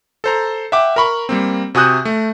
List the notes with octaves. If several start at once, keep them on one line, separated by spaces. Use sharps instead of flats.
A4 C5 A#5
E5 F#5 G5 D6
A#4 A#5 B5 C#6
G3 A#3 C4
C3 F#4 G#5 D#6 F#6 G6
A3